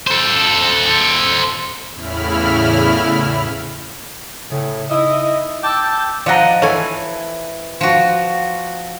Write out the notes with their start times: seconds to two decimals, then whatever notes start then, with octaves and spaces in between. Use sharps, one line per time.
0.07 A4 C5
1.94 E2 A2 C#3 E4 B5 F6
4.50 A2 C#3
4.89 D#4 E4 D#5 E6
5.63 G5 A5 D6 E6
6.26 F3 D5 D#5 F#5 A#5
6.62 E3 A4 C#5 G#5
7.81 F3 F#4